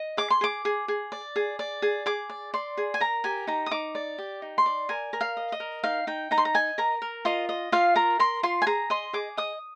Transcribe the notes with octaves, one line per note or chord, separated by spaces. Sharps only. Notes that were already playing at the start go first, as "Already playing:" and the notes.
Already playing: D#5
G#4 D6
C6
G#4 D6
G#4
G#4
D5
G#4
D5
G#4
G#4 D6
D5
D5 C6
G#4
G#5
A#4 A#5
G4 G#5
D#4 A#5
D#6
D#4 D6
D5
G4
D#4
C6
D5
A#4 G#5
A#4
F5
D#5
D#5
A#4
D#4 F5
D#4 G5
D#4 A#5
C6
A#5
D#5 G#5
A#4 A#5
A#4
F4 D#5
D#5
F4 F5
A#4 A#5
A#4 C6
F4 C6
G#5
G#4 A#5
D#5 C6
G#4 D6
D#5 D#6